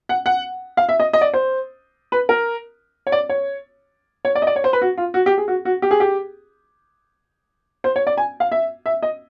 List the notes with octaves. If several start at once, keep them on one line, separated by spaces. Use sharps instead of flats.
F#5
F#5
F5
E5
D#5
D#5
D5
C5
B4
A#4
C#5
D5
C#5
C#5
D5
D#5
D5
C#5
C5
B4
F#4
F4
F#4
G4
G#4
F#4
F#4
G4
G#4
G4
C5
C#5
D5
G#5
F5
E5
E5
D#5